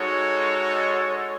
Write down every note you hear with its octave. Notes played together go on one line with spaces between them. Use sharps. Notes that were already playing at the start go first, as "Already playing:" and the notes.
Already playing: G#3 D#4 F#4 A4 C#5